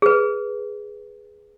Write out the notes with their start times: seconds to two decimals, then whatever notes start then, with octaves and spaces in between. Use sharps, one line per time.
0.02 G#4 B4